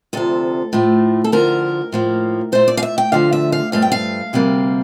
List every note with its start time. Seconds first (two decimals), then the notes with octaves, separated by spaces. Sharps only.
0.13 D2 C3 F3 A4
0.73 A2 F3 A3
1.24 A4
1.32 D2 D3 F3 A#4
1.92 A2 F3 A#3
2.52 A#2 A3 C5
2.68 D5
2.77 F5
2.83 E5
2.98 G5
3.12 D2 D3 F3 F5
3.33 E5
3.52 F5
3.72 G2 F3 A3 F5
3.82 G5
3.92 F5
4.33 D2 C3 G3 A#3